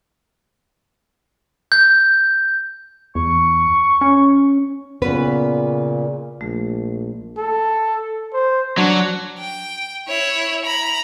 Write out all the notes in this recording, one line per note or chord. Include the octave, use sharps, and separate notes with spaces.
G6
E2 C#6
C#4
A#2 C#3 B3 C#4 B4
A#1 A3
A4
C5
F#3 D4
G5
E4 C#5
A#5 B5